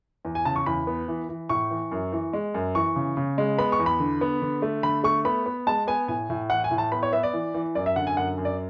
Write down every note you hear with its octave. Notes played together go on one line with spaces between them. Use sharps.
E2
G#5
C#3 A5
C#6
E2 B5
B3
E3
E3
A2 C#6
E3
F#2
E3
G#3
F#2
E3 C#6
C#3
C#3
G#3
B3 B5
C#6
E2
B5
D3
B3
D3
A3
D3 B5
A3 C#6
B3 B5
B3
G#3 A5
B3 G#5
A2 G#5
A2
E3 F#5
G#5
A2
A5
B3 B5
C#5
B3 E5
D5
E3
E3
F#2 D5
E5
D3 F#5
G#5
F#2 F#5
F#2
D5